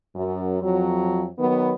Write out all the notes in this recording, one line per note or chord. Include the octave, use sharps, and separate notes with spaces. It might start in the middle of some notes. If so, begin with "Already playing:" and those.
F#2
F2 F#3
D#3 F#3 B3